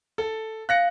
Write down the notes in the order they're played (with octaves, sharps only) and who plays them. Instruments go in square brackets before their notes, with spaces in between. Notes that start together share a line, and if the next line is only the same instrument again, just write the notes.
[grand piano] A4
[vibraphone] F5 [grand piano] F#6 A#6 C#7